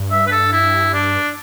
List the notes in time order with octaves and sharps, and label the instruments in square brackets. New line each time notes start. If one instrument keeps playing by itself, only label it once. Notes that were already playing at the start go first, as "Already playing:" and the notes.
Already playing: [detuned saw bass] G2
[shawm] E5
B4
A4
E4
D4